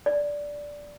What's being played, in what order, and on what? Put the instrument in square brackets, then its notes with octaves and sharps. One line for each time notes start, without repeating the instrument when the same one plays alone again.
[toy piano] D5